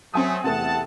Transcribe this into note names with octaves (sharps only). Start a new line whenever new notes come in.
F#3 A3 C4 G#5 D#6
E2 C3 A3 F#5 A5